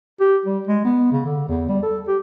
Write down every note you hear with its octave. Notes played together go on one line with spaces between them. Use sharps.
G4
G3
G#3
B3
C#3
D3
E2
G3
A4
G4